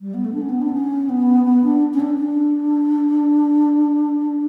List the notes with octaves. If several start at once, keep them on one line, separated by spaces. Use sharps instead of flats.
G3
B3
A3
D4
C#4
B3
D4
C#4
B3
B3
D4
C#4
D4
D4